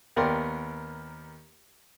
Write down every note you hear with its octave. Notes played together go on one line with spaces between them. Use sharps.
D#2 B3 A#4 D5 G5 C6